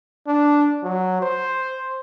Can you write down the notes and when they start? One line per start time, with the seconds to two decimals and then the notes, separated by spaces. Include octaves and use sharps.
0.27 D4
0.83 F#3
1.22 C5